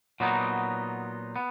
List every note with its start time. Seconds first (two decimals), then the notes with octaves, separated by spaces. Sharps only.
0.20 A#2 F#3 B3 D#4
1.36 B3